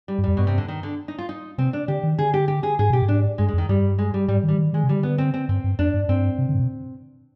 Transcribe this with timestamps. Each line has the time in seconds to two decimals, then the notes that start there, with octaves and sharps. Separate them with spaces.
0.08 G3
0.18 G2
0.24 F2 G3
0.37 G2 B2
0.47 C3
0.58 D3
0.68 D#3
0.83 D3
1.08 D#4
1.19 F4
1.29 D#4
1.58 C3 C4
1.73 D4
1.88 D3 G4
2.03 D#3
2.19 D3 G#4
2.34 G4
2.48 G4
2.63 G#4
2.79 G#2 G#4
2.90 B2 G4
3.02 G#2
3.08 D4
3.38 G2 G#3
3.48 G#3
3.53 F2 D#3
3.69 G2 G3
3.99 G#3
4.14 G3
4.28 G#2 G3
4.43 D#3
4.49 G3
4.58 D#3
4.73 D#3 G#3
4.84 C3
4.89 D3 G3
5.03 B3
5.18 C4
5.34 C4
5.49 G2 C4
5.64 G2
5.79 F2 D4
5.94 G2
6.09 G2 C4
6.38 C3
6.49 D3
6.55 G#2
6.59 B2